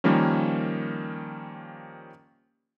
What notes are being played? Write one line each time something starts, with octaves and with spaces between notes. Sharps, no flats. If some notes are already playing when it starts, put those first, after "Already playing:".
D#3 F3 G3 A#3 C#4